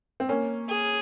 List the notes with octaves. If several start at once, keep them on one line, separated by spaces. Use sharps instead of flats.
C4
A#3 C#4
G#4